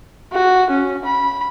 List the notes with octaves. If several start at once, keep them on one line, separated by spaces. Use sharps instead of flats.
F#4
C#4
B5